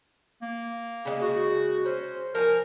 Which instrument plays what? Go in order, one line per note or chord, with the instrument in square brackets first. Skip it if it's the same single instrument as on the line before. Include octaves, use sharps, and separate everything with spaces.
[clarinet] A#3
[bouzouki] C#3 F#3 G#3
[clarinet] F#4
[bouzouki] C#4 [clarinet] C5
[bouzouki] F3 G#5 [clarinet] A#4